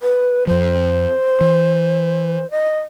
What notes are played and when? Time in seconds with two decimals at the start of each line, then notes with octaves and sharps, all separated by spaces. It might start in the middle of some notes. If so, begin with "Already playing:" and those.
0.01 B4
0.47 F2 F3 C5
1.41 E3
2.51 D#5